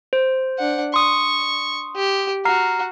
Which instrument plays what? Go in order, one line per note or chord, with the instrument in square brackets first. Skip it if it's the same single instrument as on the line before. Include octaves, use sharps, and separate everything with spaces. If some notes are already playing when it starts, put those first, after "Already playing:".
[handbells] C5
[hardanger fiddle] D4 F#5
[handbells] C6 D#6 [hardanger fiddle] C#6
[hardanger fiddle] G4
[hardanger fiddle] F#4 [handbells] A#5 F6 C7